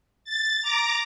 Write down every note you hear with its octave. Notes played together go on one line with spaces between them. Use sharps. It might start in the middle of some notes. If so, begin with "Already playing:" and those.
A6
A#5 D6